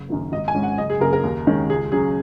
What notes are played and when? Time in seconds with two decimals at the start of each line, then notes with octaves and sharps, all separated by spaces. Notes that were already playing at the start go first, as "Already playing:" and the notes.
Already playing: F#1
0.09 F#2 D#3 F#3 A#3
0.32 G#1 D#5
0.48 G#5
0.55 G#2 G#3 C#4
0.63 F#5
0.78 F#1 D#5
0.90 G#4
1.00 F#2 C#3 A#3 A#4
1.13 A#4
1.24 D#2
1.47 D#3 G#3 C#4
1.69 C#2 G#4
1.92 C#3 F#3 C#4 G#4